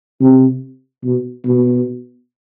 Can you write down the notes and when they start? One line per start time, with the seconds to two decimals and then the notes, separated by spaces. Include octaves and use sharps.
0.21 C3
1.04 B2
1.45 B2